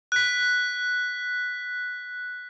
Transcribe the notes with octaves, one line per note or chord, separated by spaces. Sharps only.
F#6 B6